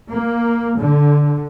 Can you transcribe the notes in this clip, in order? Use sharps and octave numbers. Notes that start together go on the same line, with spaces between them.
A#3
D3